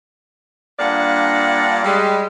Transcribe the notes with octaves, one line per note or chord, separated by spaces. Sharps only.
G2 A#3 D4 F4 D5 F#5
G3 G#3